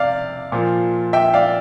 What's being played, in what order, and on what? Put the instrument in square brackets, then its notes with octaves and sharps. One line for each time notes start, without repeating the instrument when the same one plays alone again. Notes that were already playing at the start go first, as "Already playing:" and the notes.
Already playing: [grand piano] C3 D5 F5
A#2 F3
E5 G5
D5 F5